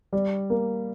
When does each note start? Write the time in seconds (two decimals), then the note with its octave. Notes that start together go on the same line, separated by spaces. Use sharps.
0.13 G3
0.50 A#3